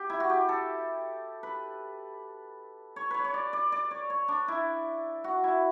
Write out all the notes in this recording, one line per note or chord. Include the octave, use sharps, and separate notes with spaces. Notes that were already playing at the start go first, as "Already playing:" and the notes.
Already playing: G4
E4
F#4
G4
A4
B4
C#5
B4 C#5
C#5
D5
D5
D5
C#5
C#5
D4
E4
F#4
E4